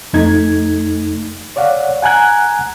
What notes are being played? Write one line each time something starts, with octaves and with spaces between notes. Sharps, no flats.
F2 A3 D#4 G#6
C#5 D5 F5 F#5
F#5 G#5 A#5 F#6 G#6